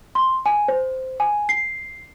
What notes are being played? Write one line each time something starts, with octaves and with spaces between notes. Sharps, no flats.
C6
G#5
C5
G#5
C7